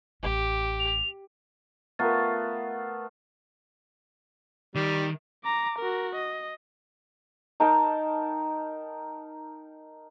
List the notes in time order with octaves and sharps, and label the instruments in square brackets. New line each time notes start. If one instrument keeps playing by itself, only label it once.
[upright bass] A1 C#4 [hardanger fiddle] G4
[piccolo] F7
[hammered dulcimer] A3 B3 F4 [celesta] A#4 A#5 A6
[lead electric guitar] D#3 [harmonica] G3
[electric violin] A#5 D6
F#4 A#4
D#5
[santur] D#4 A#4 G5 A5